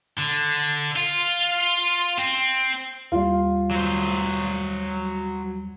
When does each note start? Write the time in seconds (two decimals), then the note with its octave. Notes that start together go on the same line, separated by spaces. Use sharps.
0.18 D3
0.96 F4
2.18 C4
3.12 D#2 G3 F4
3.71 F#3 C5